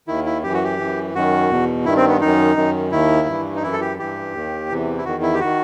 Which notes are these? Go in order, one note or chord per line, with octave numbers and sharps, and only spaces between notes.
D#2 D#3 E4
E4
F#2 E3 G4
F#4
G4
F#2 E3
F#2 D#3 F#4
E2 B2
G2 D#3 E4
C4
B3
F#2 D#3 D#4
F#2 D#3
D#2 D#3 E4
G2 E3
D#4
F#2 E3 E4
A4
G4
G2 E3 G4
D#2 D#3
E2 C3 E3
E4
E2 D#3 F#4
E4
G4
D#3 F#4